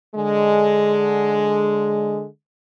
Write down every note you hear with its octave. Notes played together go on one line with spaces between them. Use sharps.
D3 G#3